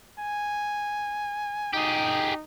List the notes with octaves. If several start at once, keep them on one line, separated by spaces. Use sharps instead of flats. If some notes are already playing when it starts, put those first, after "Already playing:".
G#5
D#4 G4 G#4